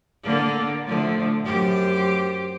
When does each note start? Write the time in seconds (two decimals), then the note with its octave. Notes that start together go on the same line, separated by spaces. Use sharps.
0.23 D3 A#3
0.86 D3 F3 A3
1.44 F#2 G4 C5